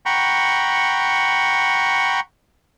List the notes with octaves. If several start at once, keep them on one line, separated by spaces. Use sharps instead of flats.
F#5 G5 A#5 B5 C#6